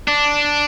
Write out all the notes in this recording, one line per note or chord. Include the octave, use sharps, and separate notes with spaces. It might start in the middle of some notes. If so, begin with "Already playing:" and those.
D4